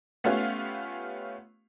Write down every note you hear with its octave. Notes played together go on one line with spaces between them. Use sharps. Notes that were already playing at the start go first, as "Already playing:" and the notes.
A3 B3 C#4 F4 G4 F5